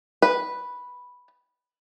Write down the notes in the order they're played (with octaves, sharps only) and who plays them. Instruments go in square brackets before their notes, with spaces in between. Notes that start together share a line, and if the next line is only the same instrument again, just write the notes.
[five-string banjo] B4